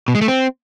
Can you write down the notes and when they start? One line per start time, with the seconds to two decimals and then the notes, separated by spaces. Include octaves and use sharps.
0.08 B2
0.15 G#3
0.21 A3
0.28 C4